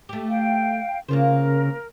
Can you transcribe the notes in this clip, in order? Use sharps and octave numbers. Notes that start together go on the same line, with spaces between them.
A3 G4
F5 G5
C#3 A#3 F4 A#4 C5